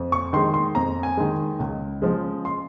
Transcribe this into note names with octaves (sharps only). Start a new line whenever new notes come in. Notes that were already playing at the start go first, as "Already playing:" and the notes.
Already playing: F2
C#6
D#3 G#3 C6
C6
F2 A#5
G#5
D#3 G#3
C#2
C#3 F3 G#3
C6